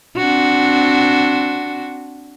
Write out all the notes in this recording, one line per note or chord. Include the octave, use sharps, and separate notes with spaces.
C4 D4 F#4